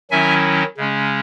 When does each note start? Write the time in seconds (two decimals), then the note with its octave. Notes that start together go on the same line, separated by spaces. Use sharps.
0.11 D#3 F#3 C#4 E4 E5 G#5
0.77 C#3 G#3 C#4